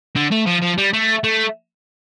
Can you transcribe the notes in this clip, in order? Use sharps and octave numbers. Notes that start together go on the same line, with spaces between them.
D3
A3
F3
F3
G3
A3
A3